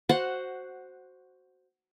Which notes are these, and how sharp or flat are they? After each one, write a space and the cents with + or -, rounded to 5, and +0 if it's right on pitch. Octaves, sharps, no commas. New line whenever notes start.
F#4 +5 C5 +5 F#5 -5